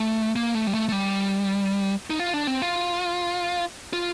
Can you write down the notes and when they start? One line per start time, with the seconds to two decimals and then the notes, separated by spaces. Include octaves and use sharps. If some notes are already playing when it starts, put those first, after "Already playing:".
Already playing: A3
0.36 A#3
0.55 A3
0.67 G3
0.74 A3
0.89 A3
0.92 G3
2.10 D#4
2.20 F4
2.34 D4
2.47 C4
2.62 F4
3.93 F4